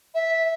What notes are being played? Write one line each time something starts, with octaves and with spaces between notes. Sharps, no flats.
E5